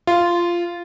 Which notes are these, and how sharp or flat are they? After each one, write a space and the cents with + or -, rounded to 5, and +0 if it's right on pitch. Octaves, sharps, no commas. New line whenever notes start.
F4 -10